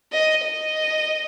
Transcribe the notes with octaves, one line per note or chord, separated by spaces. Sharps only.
D#5
D#5